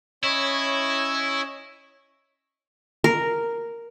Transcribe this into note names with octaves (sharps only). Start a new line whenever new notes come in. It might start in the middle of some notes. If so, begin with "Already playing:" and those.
C#4 E4 C#5 D#5
A#4